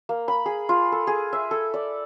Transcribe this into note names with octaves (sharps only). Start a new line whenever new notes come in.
A#3
B5
G#4
F4
A4
G#4
E5
A4
D5